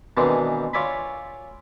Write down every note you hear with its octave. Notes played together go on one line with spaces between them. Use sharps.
B2 D#3 E3 G#3 C4 D4
F4 C#5 D5 E5 G#5 B5